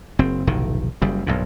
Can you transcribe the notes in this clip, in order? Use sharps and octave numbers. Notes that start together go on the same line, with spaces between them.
F#1 C4
F1 B1 A2 D#3
F#1 C#3 G3
B1 G2 A#2